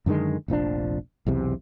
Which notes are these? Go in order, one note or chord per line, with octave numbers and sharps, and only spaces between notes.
F#2 D3 D#3 G#3
F1 A#1 F3 D4
B1 E2 C3